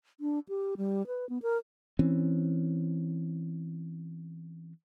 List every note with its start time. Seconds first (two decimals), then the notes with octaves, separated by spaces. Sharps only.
0.20 D4
0.49 G4
0.77 G3
1.07 B4
1.29 B3
1.42 A#4
1.99 E3 C4 C#4